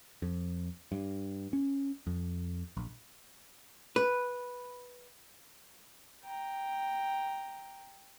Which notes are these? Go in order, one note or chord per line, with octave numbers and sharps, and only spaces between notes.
F2
G2
C#4
F2
A#1
B4
G5 A#5